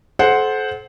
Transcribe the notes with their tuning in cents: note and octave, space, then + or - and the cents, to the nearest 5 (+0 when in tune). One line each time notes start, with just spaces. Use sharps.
A4 -35 C5 +0 F#5 +0